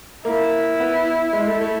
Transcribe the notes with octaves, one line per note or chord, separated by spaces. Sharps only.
A#3 E4
B3
G#3
A3
A3